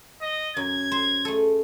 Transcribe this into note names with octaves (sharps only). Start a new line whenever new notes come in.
D#5
F#2 G#6
C5
A3 G#4 A4